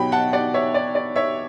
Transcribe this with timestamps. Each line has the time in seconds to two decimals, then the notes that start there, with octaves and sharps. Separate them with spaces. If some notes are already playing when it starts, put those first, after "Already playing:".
Already playing: B2 F#3 B3 G5 B5
0.12 F#5 A5
0.33 D5 F#5
0.54 C#5 E5
0.74 D5
0.95 D5
1.16 C#5 E5